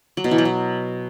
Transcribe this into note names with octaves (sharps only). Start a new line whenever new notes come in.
F#3
B2
E3
F#3
B2